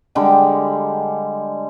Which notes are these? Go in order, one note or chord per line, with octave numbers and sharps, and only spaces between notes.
D3 G3 G#3 G5